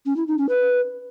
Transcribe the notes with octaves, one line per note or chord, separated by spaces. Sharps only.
C#4
E4
D#4
C#4
B4